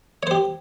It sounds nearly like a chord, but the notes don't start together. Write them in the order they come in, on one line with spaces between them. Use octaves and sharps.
C#5 C5 G4